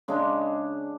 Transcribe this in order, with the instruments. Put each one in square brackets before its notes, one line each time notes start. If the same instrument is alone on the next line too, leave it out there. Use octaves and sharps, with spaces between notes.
[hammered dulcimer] C#3 G#3 D4